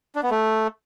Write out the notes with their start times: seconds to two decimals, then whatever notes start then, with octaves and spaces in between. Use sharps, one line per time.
0.15 D4
0.23 B3
0.31 A3